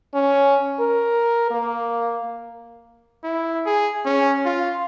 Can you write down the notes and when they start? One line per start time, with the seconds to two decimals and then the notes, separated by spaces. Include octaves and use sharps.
0.14 C#4
0.80 A#4
1.51 A#3
3.24 E4
3.66 G#4
4.05 C#4
4.45 F4